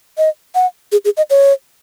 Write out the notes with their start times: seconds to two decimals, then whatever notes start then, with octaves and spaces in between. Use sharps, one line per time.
0.18 D#5
0.55 F#5
0.92 G#4
1.05 G#4
1.17 D#5
1.30 C#5